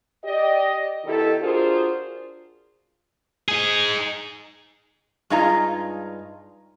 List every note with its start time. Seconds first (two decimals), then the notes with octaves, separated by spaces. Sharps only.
0.23 G4 D5 D#5
1.04 B2 D#3 E4 G4 A4
1.40 D4 F4 F#4 G#4 A#4 C5
3.48 D#4 G#4
5.30 G2 G#3 D#4 F4 G#4 A#5